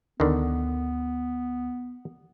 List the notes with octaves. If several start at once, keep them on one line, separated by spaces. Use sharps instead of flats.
D2 D3 D#3 B3